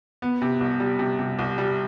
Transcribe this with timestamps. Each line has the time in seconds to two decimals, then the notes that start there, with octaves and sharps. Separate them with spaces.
0.22 B3
0.42 C3
0.61 C2
0.80 G3
0.99 C3
1.19 C3
1.39 C2
1.58 G3